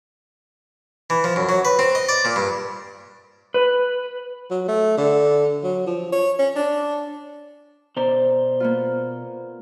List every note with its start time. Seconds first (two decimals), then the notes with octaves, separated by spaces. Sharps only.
1.10 E3
1.24 F3
1.36 F#2
1.49 F#3
1.65 B4
1.79 C4
1.95 D#5
2.09 D5
2.25 A#2
2.36 G2
3.54 B4
4.50 F#3
4.68 A3
4.97 D3
5.63 F#3
5.86 F3
6.12 C#5
6.39 C#4
6.56 D4
7.97 B2 C5 D5 A#5
8.60 A#3 B3 F4